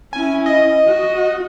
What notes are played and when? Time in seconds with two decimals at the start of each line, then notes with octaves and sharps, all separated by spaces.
0.13 C#4 E4 G#5
0.46 D#5
0.87 F#4